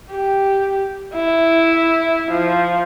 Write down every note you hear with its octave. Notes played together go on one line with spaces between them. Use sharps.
G4
E4
F3